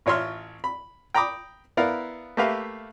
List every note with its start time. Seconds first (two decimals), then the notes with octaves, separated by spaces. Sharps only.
0.06 A1 F4 C#5 E5 C6 F6
0.64 B5
1.15 G5 A#5 B5 D6 D#6
1.77 B3 E4 A#4 D5 F5
2.37 A3 A#3 G4 B4 E5 F5